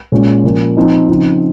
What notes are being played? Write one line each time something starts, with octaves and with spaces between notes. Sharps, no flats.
A#2 G#3 C#4
A#2 F3 A#3 C#4
F3 C4 D#4
C#3 F3 C4 D#4